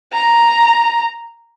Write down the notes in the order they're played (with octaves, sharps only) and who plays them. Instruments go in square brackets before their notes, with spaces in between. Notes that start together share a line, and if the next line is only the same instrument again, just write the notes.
[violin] A#5